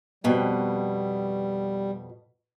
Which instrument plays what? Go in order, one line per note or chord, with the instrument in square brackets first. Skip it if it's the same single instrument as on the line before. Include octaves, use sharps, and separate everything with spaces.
[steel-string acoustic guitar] F2 B2 [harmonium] G3